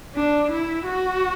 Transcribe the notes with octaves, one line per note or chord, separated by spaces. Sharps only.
D4
E4
F#4